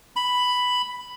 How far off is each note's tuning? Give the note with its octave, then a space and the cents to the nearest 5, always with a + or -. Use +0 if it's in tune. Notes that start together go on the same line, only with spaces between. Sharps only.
B5 +5